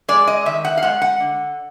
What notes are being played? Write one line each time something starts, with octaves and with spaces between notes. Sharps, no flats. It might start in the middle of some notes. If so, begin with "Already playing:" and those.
G#3 D5
D#5
D#3 E5
F#5
F5
G#3 F#5
F#5
D3